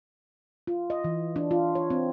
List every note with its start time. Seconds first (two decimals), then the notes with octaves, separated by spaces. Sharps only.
0.67 F4
0.90 D#5
1.04 E3
1.36 D4
1.51 F4
1.75 C#5
1.90 C4